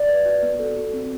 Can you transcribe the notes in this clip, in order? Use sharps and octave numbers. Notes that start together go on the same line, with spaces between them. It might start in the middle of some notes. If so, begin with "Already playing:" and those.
Already playing: D5
B4
F#4
B3
A4
F#4
C4